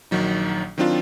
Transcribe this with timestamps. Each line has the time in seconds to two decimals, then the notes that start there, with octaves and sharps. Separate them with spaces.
0.11 A#1 D#3 F#3 D#4
0.78 D#3 F#3 C4 D4 F4